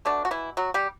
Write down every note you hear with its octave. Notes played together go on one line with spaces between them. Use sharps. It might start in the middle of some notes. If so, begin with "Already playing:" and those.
B2 D3 A3 D4
F#4
E3 E4
F#3 F#4
G3 G4